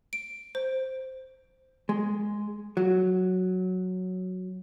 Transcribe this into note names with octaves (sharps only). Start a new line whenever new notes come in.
D7
C5
G#3
F#3